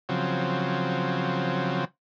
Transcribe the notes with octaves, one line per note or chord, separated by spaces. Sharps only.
C#3 F3 F#3 C4